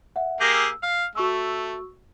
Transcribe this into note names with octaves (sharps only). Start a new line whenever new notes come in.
E5 F#5
A#3 G4 G#4 A#6
E6
F5 F6
A3 F#4 C#6 E6